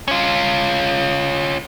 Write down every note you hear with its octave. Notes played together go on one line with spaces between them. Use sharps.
C#4 F4